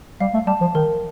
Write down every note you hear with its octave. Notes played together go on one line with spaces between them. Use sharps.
G3 F5
A3
G3 A5
F3
D#3 A#4